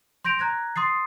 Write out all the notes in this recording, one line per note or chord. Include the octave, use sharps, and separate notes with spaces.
C6 G6 A#6 D7 F7
A#5 F#6 G#6 A#6
C6 D#6 A6 C7